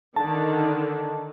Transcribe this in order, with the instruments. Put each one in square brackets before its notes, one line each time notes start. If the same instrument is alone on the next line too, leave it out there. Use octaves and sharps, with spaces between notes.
[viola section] D3 D#3 [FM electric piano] A5